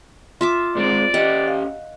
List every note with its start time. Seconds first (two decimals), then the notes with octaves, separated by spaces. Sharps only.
0.41 F4 E5 D6
0.75 G#2 G#3 C4 D5
1.14 C#4 G4 D#5 F#5
1.48 F5